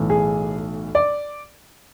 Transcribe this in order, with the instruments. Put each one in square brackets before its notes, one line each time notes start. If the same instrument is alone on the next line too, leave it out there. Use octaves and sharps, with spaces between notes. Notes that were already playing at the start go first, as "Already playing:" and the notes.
Already playing: [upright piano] B1 A2 E3
G#4
D5